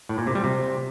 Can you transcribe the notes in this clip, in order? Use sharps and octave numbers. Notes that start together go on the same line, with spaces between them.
A2
A#2
C3
G3
C3